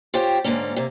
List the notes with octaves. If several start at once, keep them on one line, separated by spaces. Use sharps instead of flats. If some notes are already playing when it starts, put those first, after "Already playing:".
F4 G4 C5 C#5 G5
G#2 D3 A#3 C#4
C3 A#3